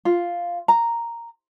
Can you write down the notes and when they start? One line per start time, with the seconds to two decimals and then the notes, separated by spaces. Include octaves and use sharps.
0.05 F4
0.68 A#5